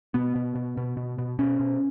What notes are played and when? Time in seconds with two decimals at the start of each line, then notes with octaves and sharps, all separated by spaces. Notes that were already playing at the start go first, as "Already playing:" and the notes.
0.14 B2 B3
0.35 B2
0.55 B2
0.77 B2
0.97 B2
1.19 B2
1.39 B2 C#4
1.60 B2